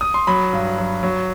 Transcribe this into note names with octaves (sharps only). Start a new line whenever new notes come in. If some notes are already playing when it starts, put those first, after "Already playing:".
D#6
C6
F#3 B5
G2
F#3
F#3